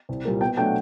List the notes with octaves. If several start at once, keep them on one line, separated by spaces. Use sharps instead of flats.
C2
A#2 G3 A#3
B2 G5
F#3 A3 D4 G5
F#5